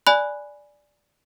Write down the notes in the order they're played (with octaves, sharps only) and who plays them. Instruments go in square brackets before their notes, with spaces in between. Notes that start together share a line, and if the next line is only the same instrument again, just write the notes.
[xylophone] D5 G#5 B5 F#6